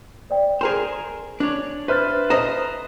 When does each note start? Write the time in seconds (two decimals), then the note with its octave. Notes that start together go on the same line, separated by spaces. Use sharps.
0.30 C5 D5 G5
0.61 G#4 A#4 C5 G#5
1.40 D4 C#5
1.88 B4 C5 E5 F6 A6
2.30 C5 D#5 A#5